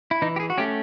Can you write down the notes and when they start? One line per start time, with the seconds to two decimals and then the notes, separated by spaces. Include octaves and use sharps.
0.11 E4
0.22 E3 D#4
0.36 G4
0.40 G#4
0.50 F#4
0.58 A3 C#4 G4